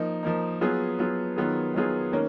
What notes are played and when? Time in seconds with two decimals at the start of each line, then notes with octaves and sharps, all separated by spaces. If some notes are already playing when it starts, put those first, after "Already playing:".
Already playing: F3 A#3 D#4
0.23 F3 A#3 D#4
0.61 F#3 B3 F4 G#4
0.99 F#3 B3 F4 G#4
1.36 D#3 F#3 B3 F4 G#4
1.74 D#3 F#3 B3 F4 G#4
2.12 D#3 A#3 C#4